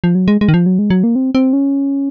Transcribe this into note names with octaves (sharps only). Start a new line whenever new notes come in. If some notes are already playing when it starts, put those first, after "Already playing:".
F3
F#3
G#3
G#3
D#3
F3
F#3
G#3
F#3
A#3
C4
C4
C#4